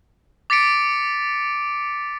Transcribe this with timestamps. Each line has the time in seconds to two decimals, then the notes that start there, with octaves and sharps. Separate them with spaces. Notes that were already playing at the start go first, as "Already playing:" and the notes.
0.50 D6 A6 B6 C#7 D7